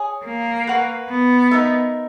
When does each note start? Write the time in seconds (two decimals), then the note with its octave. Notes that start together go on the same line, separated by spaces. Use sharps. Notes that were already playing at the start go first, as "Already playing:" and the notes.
Already playing: G#4 C#5 G#5 D#6
0.25 A#3
0.67 B4 F#5 C#6
1.10 B3
1.51 D#4 A#4 E5